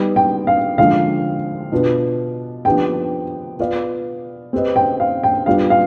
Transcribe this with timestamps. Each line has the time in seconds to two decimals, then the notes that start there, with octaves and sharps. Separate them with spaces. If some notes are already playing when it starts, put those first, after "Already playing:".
Already playing: G3 B3 D#4
0.16 G5
0.47 F5
0.78 D3 F3 G#3 F5
1.72 B2 B3 D4 F4 B4
2.65 F3 B3 D4 G4 B4 G5
3.59 B3 F4 B4 D5 F5
4.53 C4 G4 B4 D#5
4.76 G5
5.00 F5
5.23 G5
5.46 G3 B3 D4 F4 F5
5.70 F5